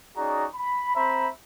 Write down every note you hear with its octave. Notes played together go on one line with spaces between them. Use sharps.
C#4 D#4 F#4 G#4 D5 A#5
B5
C4 C5 E5 A#5 B5